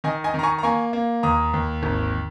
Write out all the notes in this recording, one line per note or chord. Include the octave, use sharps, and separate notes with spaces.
D#3 D#5 G#5
D#5 G#5
D#3 A#5
G#5 C#6
A#5
A#3 G#5 C#6
A#3
D#2 A#5 D#6
D#2
G#1